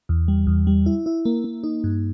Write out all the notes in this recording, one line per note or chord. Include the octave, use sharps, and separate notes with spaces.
E2
G3
E2
G3
E4
E4
A#3
A#3
D#4
G2